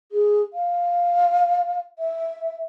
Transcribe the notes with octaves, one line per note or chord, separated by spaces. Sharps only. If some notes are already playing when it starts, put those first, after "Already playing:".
G#4
F5
E5